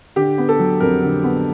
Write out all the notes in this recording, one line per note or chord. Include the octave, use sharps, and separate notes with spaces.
D3 G4
B3
A4
F#3
F2 A#4
D3
B3